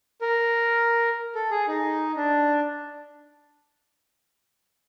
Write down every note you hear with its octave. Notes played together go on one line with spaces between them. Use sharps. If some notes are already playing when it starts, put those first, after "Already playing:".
A#4
A4
G#4
D#4
D4